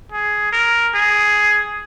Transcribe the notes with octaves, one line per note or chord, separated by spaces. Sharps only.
G#4
A#4
G#4